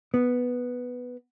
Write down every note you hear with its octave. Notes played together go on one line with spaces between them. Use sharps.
B3